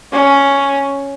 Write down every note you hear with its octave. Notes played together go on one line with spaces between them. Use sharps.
C#4